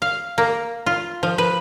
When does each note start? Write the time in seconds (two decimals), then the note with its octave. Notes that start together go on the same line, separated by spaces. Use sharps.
0.02 F5
0.38 A#3
0.86 F4
1.23 F3
1.38 B4